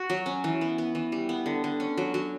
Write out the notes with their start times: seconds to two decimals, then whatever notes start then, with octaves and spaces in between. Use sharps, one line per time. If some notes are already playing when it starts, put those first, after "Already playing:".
Already playing: F#4
0.10 F#3
0.26 C#4
0.44 E3
0.61 B3
0.78 B3
0.95 E3
1.12 G3
1.29 B3
1.46 D3
1.64 D3
1.80 C#4
1.97 F#3
2.14 F#3